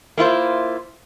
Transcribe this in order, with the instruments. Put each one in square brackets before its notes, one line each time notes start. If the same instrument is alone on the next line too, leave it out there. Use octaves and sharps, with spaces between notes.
[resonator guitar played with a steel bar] A#3 E4 F4 C5